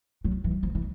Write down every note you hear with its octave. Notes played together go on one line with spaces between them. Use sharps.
F#3
E3
F3
E3